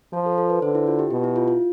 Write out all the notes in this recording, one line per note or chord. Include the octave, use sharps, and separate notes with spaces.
F3 F4
A4
A4
B4
D3 C5
E4
F4
G4
B2 G4
E4
F4
F4